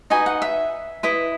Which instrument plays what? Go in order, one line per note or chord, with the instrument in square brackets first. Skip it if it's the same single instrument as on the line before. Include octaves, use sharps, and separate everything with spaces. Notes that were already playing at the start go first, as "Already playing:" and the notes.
[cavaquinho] D#4 F#4 B4 D#5 G#5
F#5
E5
E4 B4 D#5